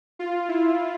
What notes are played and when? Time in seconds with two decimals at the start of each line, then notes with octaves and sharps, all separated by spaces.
0.19 F4
0.49 E4